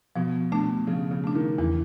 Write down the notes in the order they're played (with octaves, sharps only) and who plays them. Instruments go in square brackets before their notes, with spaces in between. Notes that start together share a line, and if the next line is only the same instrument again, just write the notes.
[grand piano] B2 [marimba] F3
[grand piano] B2 [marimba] A3 D4
[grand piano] C#3 [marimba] F3
[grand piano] C#3
[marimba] A3 D4
[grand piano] D#3
[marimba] E2 [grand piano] E3